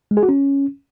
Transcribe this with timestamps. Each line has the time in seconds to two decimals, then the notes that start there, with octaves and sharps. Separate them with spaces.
0.11 G#3
0.17 G#4
0.23 F#4
0.29 C#4